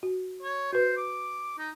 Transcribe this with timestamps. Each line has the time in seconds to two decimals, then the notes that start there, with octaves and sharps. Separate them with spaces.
0.03 F#4
0.42 C#5
0.73 F#4 B4 C5
0.97 D6
1.58 D#4